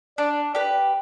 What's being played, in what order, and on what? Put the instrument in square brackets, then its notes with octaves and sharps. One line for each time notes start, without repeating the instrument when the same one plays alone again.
[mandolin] D4 [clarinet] D5
[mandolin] G4 B4 [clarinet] D5